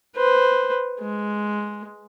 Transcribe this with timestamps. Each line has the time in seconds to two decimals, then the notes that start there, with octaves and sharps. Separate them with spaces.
0.16 B4 C5
1.01 G#3